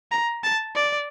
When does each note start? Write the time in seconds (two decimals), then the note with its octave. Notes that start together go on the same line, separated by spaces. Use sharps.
0.11 A#5
0.44 A5
0.76 D5